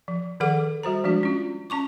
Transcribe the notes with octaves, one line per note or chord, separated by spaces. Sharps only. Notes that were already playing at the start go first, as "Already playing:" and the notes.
F3
D#3 F3 G#4 A4 F#5 D6
G3 F#4 C5 A#5
F3 G#3 D4 F#4
C#4 F4
C#4 A5 C#6 D6